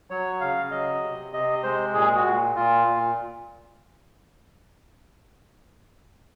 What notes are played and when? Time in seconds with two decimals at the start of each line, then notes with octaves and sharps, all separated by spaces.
0.10 F#3 C#5
0.41 C#3 F5
0.71 F#3 D#5
1.03 C3
1.33 C3 D#5
1.63 G#3 C5
1.94 A#2 G#4
2.16 F#4
2.26 A#2
2.56 A#2 F4
2.87 A#2